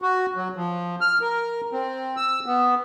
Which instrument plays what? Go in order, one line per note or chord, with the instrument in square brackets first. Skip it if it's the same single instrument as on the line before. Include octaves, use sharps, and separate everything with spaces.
[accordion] F#4
F#3
F3
F6
A#4
C4
E6
B3